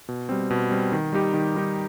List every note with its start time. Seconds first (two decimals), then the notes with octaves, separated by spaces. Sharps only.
0.09 B2
0.29 G3 C4
0.50 B2
0.71 G3 C4
0.92 D#3
1.13 G3 D#4 G4
1.34 D#3
1.55 G3 D#4 G4